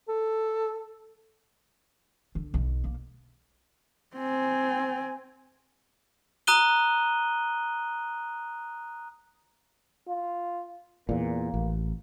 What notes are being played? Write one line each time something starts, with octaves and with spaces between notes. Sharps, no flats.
A4
D3
B1
A#3
C4 G#5
A#5 D#6 F#6 D#7 G7
F4
E2 A#2 A#3
A1